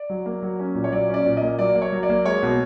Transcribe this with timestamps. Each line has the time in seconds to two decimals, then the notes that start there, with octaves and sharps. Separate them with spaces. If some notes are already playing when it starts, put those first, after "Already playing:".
Already playing: D5
0.09 F#3
0.26 A#3
0.42 F#3
0.59 C#4
0.75 A#2
0.84 C#5
0.92 F#3 D5
1.09 C#4 D5
1.26 A#2
1.37 A#3 D#5
1.59 F#3 D5
1.75 A#3
1.82 C#5
1.92 F#3
2.03 D5
2.09 A#3
2.25 G#3 C#5
2.42 B2